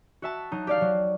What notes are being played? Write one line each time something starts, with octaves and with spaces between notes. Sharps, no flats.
F#4 E5 A5
F#3 D#4
G4 D5 F5
F#3